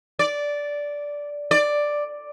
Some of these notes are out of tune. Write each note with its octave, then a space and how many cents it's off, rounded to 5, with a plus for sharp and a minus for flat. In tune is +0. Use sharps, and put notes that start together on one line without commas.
D5 -10
D5 +5